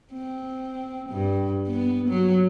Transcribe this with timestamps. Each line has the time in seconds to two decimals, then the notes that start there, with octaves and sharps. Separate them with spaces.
0.13 C4
1.10 G2
1.67 B3
2.09 F#3